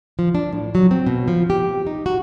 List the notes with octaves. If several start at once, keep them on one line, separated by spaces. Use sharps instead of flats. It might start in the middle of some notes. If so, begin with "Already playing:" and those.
F3
D4
A2
F#3
C4
B2
F3
G4
D#4
F#4